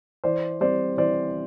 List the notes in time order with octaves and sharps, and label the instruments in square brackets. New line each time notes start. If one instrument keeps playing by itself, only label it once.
[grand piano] E3 C5 D5
G3 C4 C5 D5
E3 C5 D5